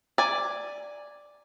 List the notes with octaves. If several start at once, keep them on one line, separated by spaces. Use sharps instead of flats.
D5 G#5